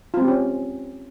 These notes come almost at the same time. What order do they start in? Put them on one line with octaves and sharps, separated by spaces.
F4 C4 G#3 G4 C#4